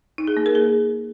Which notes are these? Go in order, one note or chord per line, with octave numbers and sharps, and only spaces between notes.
D#4
G#4
A#3
A#4
G#4